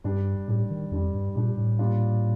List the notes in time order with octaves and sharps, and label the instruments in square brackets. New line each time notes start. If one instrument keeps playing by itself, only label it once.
[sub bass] G2 [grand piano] G3 D4 G4
[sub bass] A2 [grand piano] G3 D4 G4
[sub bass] D#3
[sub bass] F2 [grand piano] G3 D4 G4
[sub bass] G2
[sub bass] A#2 [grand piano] G3 D4 G4
[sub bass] A2
[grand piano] A#2 G3 D4 F4